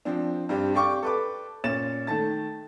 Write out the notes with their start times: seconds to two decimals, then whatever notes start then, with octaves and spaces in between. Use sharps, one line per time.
0.05 F3 C4 D4
0.49 G2 C4 D4 G4
0.74 G4 D5 F5 G5 C#6 D6
1.03 A4 B4 D6
1.64 A#2 C#4 A6 E7
2.07 D#3 A3 A5 A6